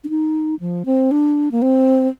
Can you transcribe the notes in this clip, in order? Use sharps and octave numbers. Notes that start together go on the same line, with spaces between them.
D4
D#4
F3
C4
D4
A#3
C4